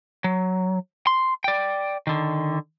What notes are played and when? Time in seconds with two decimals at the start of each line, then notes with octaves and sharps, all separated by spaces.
0.24 F#3
1.07 C6
1.44 D5 G5
2.07 D3 D#3